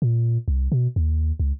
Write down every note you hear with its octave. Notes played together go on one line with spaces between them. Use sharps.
A#2
C2
B2
D#2
C#2